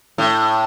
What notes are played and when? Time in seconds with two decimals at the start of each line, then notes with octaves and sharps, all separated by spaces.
0.18 A2